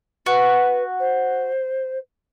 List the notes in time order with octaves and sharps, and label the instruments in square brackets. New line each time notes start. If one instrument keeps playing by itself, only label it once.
[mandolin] F#4 [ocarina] B4
[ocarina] C5